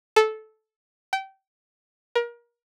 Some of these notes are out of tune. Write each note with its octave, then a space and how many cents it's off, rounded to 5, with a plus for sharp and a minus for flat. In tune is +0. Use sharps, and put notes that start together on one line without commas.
A4 -15
G5 -25
A#4 +30